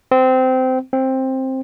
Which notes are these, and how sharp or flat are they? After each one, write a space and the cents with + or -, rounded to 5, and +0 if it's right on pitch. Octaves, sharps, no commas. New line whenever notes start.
C4 -20
C4 +10